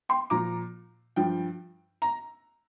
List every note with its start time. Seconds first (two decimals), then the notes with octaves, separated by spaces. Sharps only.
0.09 G5 C6
0.30 A#2 F3 A#5 D6
1.16 G2 F3 G5
2.02 A#5